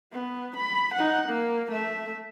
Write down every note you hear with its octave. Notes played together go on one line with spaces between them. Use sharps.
B3
B5
D#4 F#5
A#3
A3 E5